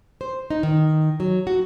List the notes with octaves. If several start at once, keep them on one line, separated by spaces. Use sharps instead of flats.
C5
D#4
D#3
F#3
F#4